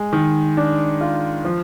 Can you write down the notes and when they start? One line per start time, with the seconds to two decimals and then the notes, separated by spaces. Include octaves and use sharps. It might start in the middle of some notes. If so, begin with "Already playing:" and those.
Already playing: G#3
0.13 D#3
0.57 D4
1.01 F4
1.45 F3